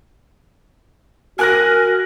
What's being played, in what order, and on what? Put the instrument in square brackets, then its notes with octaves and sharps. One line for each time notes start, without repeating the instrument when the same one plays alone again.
[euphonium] F#4 [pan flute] A#4 [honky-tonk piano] G#5 F#6 A#6